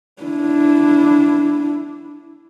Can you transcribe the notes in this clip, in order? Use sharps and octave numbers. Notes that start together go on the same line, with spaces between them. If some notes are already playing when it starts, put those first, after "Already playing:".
D4 E4